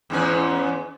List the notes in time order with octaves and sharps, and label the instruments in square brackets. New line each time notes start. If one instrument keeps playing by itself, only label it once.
[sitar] E2 G#2 C#4